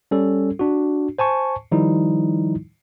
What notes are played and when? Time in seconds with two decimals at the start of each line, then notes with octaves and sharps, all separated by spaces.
0.11 G3 C#4 A4
0.59 D4 F#4
1.19 C5 G#5 A5 C#6
1.72 D#3 F3 G3 D#4 E4